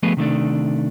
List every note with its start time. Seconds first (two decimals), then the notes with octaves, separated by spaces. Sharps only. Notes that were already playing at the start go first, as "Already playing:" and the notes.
0.03 F3 A3 B3 G#4 B4
0.17 C3 D#3 A3 D4